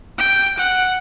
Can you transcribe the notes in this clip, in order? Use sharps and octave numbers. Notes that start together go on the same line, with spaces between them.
G5
F#5